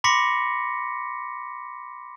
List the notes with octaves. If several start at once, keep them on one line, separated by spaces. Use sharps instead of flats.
B5 C6 D6 A#6 B6 C#7